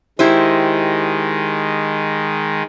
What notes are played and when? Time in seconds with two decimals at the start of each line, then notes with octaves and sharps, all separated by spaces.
0.19 D#3 G#3 E4 G4 C5